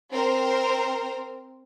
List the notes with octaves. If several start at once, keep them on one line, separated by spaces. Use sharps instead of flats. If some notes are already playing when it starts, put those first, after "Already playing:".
C4 A#4 C5